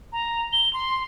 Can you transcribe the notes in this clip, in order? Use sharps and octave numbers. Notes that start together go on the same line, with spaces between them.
A#5
G7
C6